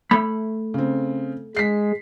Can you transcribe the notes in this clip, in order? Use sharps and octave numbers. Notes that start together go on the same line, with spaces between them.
A3 B5
C#3 C4
G#3 B6 C7